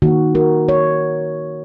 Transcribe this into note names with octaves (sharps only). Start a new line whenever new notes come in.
D#3 A#3 F#4
F#4 A#4
C#5